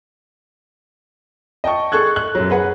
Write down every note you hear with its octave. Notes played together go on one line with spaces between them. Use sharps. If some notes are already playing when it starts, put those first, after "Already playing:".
D#5 G5 A5 C#6
G#4 A4 C#6 F#6 G#6
F#6
F#2 F#3
G#4 B4 F#5